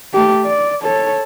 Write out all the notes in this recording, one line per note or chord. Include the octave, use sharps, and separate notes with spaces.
A3 G4
D5
A4 C#5